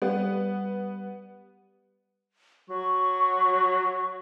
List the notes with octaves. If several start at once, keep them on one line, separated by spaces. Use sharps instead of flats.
G3 B3
F#3 C#6